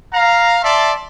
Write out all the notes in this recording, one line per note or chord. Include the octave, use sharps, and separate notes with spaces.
F5 A#5
D5 E5 A5 C6